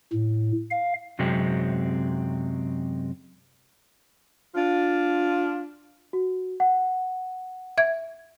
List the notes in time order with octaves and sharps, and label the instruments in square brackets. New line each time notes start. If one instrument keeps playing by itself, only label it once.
[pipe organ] A2
F5
[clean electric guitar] F#2 C3 F#3 G#3 C4
[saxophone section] D4 F4
[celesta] F#4
F#5
[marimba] E5 G#6